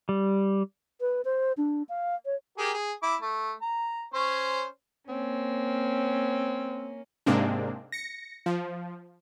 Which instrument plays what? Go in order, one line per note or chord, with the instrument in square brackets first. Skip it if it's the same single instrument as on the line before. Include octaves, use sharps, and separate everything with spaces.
[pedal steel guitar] G3
[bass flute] B4
C5
D4
F5
C#5
[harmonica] G4 G#4 A#4
G#4
E4 D6
A3
A#5
C#4 C5 C#5
[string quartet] A#3 C#4 [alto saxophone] C4
[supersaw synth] G#2 C3 G#3 A#3 C4 D4
A#6 C#7
F3